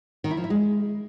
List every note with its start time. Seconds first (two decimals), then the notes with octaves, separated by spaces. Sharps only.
0.24 D#3
0.31 E4
0.37 F3
0.44 E4
0.50 G#3